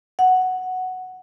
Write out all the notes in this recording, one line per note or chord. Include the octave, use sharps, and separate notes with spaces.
F#5